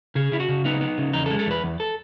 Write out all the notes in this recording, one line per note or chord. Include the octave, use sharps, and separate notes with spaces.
C#3 G#4
C#3 E4
F#4
C#3
B3 D#4
B3
C#3
E2 D#4
A4
G#3
A4
E2 B4
E2
A4